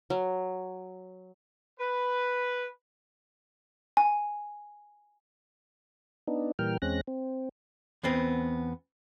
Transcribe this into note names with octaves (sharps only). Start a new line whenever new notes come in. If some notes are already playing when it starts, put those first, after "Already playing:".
F#3
B4
G#5
B3 D4 D#4
A#2 E3 G3 A#4 G5 F6
E2 G#3 C4 C#4 F#6 A#6
C4
E2 B3 C4